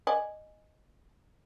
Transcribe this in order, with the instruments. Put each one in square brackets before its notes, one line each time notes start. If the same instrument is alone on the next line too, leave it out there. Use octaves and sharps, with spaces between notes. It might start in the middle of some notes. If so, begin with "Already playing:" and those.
[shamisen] D5 D#5 G#5